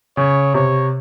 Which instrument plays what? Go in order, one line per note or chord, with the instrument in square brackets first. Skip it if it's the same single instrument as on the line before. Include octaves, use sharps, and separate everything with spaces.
[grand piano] C#3 [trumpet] C#5
[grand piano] C3 [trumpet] C#5